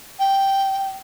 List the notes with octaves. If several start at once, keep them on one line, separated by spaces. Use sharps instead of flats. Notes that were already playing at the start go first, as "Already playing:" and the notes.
G5